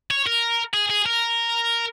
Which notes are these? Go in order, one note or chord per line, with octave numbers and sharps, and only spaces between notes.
C#5
A#4
G#4
G#4
A#4